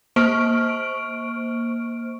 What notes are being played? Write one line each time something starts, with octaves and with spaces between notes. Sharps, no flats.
A#3 C5 C#6 F6 D7